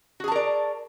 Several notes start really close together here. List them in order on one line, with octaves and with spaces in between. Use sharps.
F#4 G#4 A5 A#4 D5